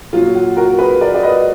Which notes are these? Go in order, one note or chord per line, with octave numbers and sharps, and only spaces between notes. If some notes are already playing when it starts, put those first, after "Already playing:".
A#2 F#3 F4
F#4
F#4 A#4
G#4 B4
A#4 D5
D5
B4 D#5